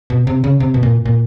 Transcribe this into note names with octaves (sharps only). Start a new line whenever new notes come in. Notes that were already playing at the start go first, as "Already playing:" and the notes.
B2
C3
C#3
C3
B2
A#2
A#2